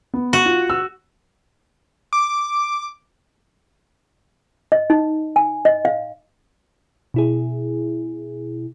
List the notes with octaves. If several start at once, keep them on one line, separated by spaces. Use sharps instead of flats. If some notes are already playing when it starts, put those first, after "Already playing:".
B3
F#4
F4
E6
D6
D#5
D#4
G#5
D#5
F5
B2 E4 G#4